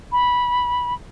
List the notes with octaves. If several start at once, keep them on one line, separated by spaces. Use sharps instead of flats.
B5